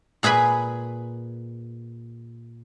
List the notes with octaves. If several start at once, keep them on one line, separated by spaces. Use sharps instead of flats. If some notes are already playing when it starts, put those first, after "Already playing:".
A#2 G#4 B4 G#5 B5